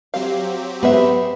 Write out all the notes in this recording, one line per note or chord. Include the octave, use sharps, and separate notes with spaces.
F#3 C4 G4 F5
B3 G#4 B4 E5